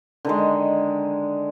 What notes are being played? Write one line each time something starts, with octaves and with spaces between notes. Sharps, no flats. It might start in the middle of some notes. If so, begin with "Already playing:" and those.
D3 D#3 G#3